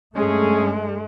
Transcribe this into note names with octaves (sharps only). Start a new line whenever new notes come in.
G2 G#3 A3 C#4 G#4